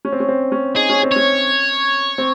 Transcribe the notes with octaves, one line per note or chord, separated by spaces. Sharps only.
C#4
C4
C#4
C4
C#4
D#4 G#4
C#4
C4
C#4 C#5
C4